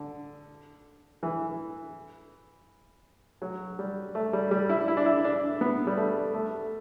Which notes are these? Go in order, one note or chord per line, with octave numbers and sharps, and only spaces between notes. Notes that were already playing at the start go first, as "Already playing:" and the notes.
Already playing: D3
E3
F#3
G3
A3
G3
G3
E4
E4
D4
E4
D4
B3
G3
A3
A3